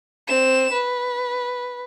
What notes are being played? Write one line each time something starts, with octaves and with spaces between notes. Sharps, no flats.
C4 E7
B4